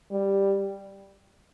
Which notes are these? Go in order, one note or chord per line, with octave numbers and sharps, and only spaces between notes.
G3